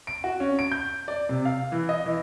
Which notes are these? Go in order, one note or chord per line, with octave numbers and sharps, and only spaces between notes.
D7
F#4
C#4
D7
G6
D5
C3
F5
E3
D#5
E3